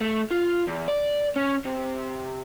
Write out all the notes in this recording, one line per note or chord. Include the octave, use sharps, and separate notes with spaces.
A3
F4
E2
D5
C#4
C3